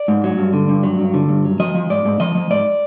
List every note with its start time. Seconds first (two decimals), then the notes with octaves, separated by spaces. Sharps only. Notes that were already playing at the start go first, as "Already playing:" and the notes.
Already playing: D5
0.08 G#2
0.24 F#3
0.38 G2
0.53 D3
0.69 G2
0.83 F#3
0.99 G2
1.14 D3
1.29 G2
1.45 F#3
1.60 F3 D#5
1.75 F3
1.90 G#2 D5
2.05 G#2
2.20 F3 D#5
2.35 F3
2.50 G#2 D5